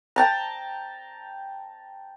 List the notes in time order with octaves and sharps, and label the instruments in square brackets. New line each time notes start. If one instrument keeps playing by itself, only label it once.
[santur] G5 A5 A#5